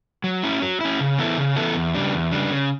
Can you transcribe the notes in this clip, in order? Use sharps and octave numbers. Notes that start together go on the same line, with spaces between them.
F#3
C#4 E4
F#3
C#4 E4
C#3
E3 B3 E4 A4
C#3
E3 B3 E4 A4
E2
C#3 G3 D4
E2
C#3 G3 D4
C#3